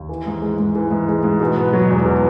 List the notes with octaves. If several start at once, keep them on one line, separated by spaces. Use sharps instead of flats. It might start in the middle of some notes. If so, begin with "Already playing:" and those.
Already playing: D#2
E3
G#2
G#3
G#2
E3
G#2
G#3
G#2
B2
B3
F#3
E2
B2